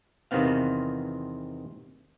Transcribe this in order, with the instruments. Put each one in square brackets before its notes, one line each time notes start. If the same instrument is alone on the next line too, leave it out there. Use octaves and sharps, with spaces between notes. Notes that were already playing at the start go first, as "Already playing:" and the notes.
[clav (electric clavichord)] E2 C3 D#3 B3 C4 F5